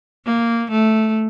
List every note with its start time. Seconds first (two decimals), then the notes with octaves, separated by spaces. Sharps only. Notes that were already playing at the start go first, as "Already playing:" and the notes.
0.25 A#3
0.71 A3